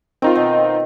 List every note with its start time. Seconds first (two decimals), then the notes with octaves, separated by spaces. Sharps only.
0.22 D#3 C4 D#4 F4
0.35 B2